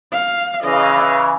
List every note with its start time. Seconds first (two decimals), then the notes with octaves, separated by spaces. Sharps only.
0.13 F5
0.64 C#3 E3 D#5 F5